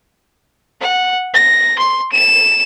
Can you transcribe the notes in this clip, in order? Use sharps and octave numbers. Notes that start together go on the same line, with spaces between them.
F#5
A#6
C6
E7